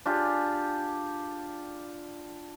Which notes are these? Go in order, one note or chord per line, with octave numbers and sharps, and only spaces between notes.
D4 F4 G4 G#4